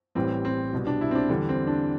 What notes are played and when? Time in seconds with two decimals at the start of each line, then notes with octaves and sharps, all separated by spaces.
0.15 A1 A2 E3 G3 C4
0.45 C4
0.73 C2 B2 G3
0.87 D4
1.01 E4
1.11 C4
1.15 D4
1.29 E2 D3 G3
1.49 C4
1.67 D4